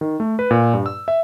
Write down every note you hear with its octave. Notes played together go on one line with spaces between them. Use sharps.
D#3
A3
B4
A#2
G2
E6
E5